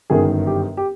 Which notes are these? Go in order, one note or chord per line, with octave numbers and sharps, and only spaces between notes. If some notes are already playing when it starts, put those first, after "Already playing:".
G1 F#2 D#3 G#4
G4
G4